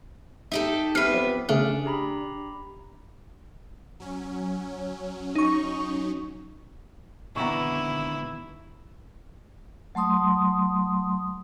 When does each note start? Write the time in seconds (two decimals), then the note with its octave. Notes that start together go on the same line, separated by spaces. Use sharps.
0.52 D#4 G4 A4 E5
0.95 B3 C4 G4 B4 E5 F6 C7
1.14 F3
1.49 C#3 A3 D4 G#4 F6
1.86 G4 A#5 B5
4.00 F#3 C#4
5.35 D#4 C#6
7.36 D#2 A#2 D3 E3 B3 E4 A#5 C#6
9.95 F#3 A3 C6 D#6